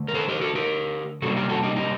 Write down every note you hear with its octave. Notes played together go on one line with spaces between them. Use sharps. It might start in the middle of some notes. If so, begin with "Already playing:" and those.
Already playing: D3 A3
A#4
A4 C5
G4 A#4
F#4 A4
G4 A#4
C3 G3 A#3 F#4 A4
G4 A#4
F#4 A4
D#4 G4
D#4 G4